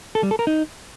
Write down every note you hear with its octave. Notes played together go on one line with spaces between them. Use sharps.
A4
G3
A4
A#4
D#4